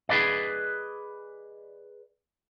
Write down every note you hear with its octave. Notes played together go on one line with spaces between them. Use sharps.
G#4 B4 D5 D#5